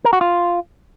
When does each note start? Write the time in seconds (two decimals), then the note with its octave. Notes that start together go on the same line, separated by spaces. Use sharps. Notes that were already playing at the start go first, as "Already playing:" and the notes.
0.05 A#4
0.13 F#4
0.21 F4